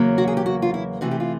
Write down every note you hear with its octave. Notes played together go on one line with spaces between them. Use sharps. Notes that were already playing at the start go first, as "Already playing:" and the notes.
Already playing: E2 C#3 F#3 A#3
F#4
G#4
G4
F#4
F4
E4
C3 E3 A3 F#4
G4
F4